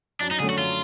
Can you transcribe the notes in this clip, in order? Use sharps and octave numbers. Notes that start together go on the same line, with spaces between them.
F#2 D4
D#4
D3 F#3 A3 C#4 G#4
F#4
F#2 F4